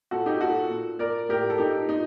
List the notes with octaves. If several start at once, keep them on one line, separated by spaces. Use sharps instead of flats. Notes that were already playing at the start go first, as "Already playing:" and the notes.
A#2 F#4 A4
D#4 G4
A#2 F#4 A4
A#2
A#2 A#4 D5
A2 G4 A#4
A4
A#2 D#4 G4
A#2 D#4